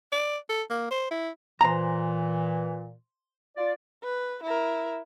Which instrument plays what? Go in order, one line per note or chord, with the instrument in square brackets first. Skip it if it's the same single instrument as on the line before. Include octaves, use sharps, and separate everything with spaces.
[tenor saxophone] D5
A4
A#3
C5
E4
[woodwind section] A#2 E3 [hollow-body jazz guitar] C5 A#5
[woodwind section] F4 D5
[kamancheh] B4
E4 A#4